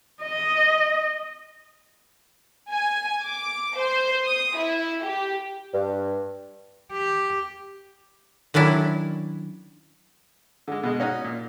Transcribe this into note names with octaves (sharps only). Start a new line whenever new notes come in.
D#5
G#5
D6
C5
D#6
E4
G4
G2
G4
D#3 F#3 C#4 D4 E4
D3 G#3
B2 G#3
C#4 D#4 F#4
A#2